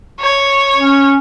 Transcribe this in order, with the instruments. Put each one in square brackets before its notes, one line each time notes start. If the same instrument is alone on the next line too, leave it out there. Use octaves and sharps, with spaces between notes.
[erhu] C#5
[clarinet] C#4